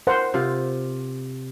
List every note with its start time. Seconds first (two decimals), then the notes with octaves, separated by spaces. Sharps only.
0.07 A#4 C5 F#5
0.34 C3 F4